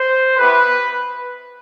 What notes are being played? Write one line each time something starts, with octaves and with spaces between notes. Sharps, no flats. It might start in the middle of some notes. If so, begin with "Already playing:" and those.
Already playing: C5
B3 E4 G4 B4